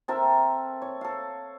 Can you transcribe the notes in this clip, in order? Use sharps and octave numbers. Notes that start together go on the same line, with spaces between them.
C4 A4 A#4 E5
C#5
A4 F5